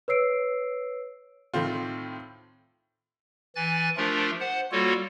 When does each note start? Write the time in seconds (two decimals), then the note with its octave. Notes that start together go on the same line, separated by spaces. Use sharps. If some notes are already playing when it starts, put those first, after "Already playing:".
0.08 B4 C#5 E6 C7 D7
1.54 A2 D#3 A3 C4 F4
3.56 E3 G#5 F#6 A6
3.97 F3 A3 D4 F4 G4 A#4
4.40 C5 F#5
4.72 G3 A#3 F4 F#4 A4 C#5